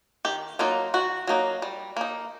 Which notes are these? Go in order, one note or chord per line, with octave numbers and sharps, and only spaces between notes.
D#3 G4
F#3 A#3 D#4 F4
D#3 F#4
F#3 A#3 D#4
G3
A#3 D#4